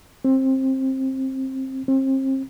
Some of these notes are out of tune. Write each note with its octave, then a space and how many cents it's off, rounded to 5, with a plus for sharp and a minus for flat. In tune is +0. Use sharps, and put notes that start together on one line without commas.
C4 +20
C4 +35